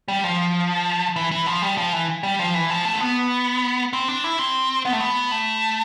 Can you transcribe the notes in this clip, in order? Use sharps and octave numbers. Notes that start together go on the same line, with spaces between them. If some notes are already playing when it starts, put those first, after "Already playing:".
G3
F3
E3
E3
F3
G3
F3
E3
G3
F3
E3
F3
A3
C4
B3
C4
D4
E4
C4
B3
A3
B3
A3